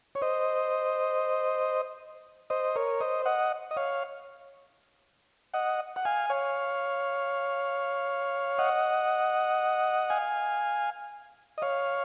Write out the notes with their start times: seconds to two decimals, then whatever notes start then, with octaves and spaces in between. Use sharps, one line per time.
0.15 C#5
0.22 C5 D#5
2.50 C5 D#5
2.76 A#4 C#5
3.01 C5 D#5
3.26 D#5 F#5
3.71 D#5
3.77 C#5 F5
5.54 D#5 F#5
5.96 F#5
6.05 F5 G#5
6.30 C#5 F5
8.59 D#5 F#5
10.10 F5 G#5
11.58 D#5
11.62 C#5 F5